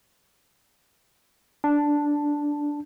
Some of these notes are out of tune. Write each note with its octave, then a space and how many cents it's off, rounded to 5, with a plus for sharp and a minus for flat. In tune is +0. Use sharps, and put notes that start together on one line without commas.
D4 -5 A5 +0